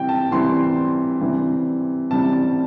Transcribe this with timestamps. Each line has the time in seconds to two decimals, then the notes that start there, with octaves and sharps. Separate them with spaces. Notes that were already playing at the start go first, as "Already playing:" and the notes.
Already playing: C3 E3 G3 G5
0.09 A5
0.31 C3 E3 G3 C6
1.21 C3 E3 G3
2.11 C3 E3 G3 A5
2.33 A5